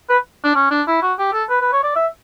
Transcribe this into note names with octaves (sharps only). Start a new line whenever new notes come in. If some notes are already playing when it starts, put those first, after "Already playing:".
B4
D4
C#4
D4
E4
F#4
G4
A4
B4
B4
C#5
D5
E5